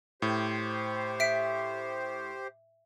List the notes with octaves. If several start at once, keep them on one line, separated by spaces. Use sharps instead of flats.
A2 G4 C5
E5 B6 D7